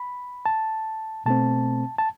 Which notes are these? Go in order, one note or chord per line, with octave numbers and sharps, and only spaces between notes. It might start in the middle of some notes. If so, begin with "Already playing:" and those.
Already playing: B5
A5
B2 A3 C4 A5
A5